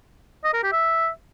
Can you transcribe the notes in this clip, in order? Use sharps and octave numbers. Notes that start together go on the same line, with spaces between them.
D#5
A#4
G4
E5